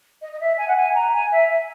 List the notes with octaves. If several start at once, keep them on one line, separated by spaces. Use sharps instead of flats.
D#5
D#5
E5
G#5
F#5
G#5
A#5
G#5
E5
E5